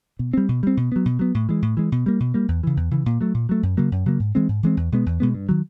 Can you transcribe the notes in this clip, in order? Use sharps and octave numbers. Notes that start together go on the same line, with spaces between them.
B2
G3 C4
B2
G3 C4
B2
F#3 B3
B2
F#3 B3
A2
E3 G#3
A2
E3 G#3
B2
G3 A#3
B2
G3 A#3
E2
C#3 E3
E2
C#3 E3
A#2
F#3 A3
A#2
F#3 A3
F#2
C#3 F#3 A#3
F#2
C#3 F#3 A#3
G#2
E3 G#3 C4
G#2
E3 G#3 C4
E2
B2 G#3 B3
E2
B2 G#3 B3
G2
D#3 F#3